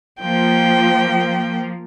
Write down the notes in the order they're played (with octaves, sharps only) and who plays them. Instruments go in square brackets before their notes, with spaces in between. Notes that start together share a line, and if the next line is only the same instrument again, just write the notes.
[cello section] F3 A#3 [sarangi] G5